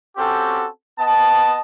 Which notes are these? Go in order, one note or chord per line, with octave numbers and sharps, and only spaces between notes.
C4 C#4 F#4 G4 A4
B3 D#5 A5